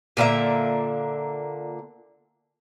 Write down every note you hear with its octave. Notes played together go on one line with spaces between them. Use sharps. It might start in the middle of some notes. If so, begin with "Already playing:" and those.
A#2 D3 A#3 E5